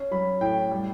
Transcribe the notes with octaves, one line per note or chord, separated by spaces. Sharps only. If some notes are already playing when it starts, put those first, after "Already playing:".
Already playing: C#4
F#3 B5
A2 G5
G3